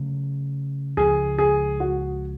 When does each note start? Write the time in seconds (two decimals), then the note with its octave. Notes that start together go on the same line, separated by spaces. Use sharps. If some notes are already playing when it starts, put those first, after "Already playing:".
Already playing: C#3 F#3 A3
0.97 C#2 C#3 F3 G#4
1.38 G#4
1.80 F#4